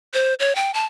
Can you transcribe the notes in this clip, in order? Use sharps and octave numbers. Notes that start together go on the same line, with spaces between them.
C5
C#5
G5
A5